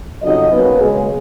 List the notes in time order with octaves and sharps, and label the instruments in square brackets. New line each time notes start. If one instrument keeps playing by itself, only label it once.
[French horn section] F2 C#3 F#3 D#4 D#5
B2 F#3 A#3 B3 C#4 B4
C#3 F#3 G#3 C#4 G#4